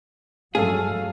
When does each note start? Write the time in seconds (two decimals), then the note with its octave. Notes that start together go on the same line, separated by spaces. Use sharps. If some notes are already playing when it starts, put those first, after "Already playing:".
0.55 G2 F#3 G#3 A3 G#4 A4 F5